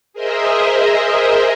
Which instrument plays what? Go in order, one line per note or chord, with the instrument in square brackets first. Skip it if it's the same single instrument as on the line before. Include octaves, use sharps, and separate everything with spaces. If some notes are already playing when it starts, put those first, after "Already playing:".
[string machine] G#4 A#4 C5 D#5 E5